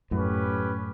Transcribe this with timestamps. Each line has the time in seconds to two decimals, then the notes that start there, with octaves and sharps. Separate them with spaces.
0.11 F#2 A2 C#4 G4 B4